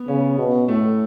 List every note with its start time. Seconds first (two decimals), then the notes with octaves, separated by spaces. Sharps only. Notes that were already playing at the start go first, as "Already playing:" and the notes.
Already playing: B3
0.08 C#3 C#4
0.38 B2
0.68 A2 A3